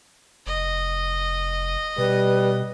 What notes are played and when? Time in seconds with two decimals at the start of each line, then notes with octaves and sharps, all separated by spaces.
0.47 F1 D#5
1.98 B2 G3 B4